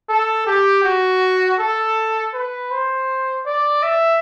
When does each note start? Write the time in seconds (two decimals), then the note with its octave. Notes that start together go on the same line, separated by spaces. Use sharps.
0.09 A4
0.47 G4
0.84 F#4
1.59 A4
2.34 B4
2.71 C5
3.46 D5
3.83 E5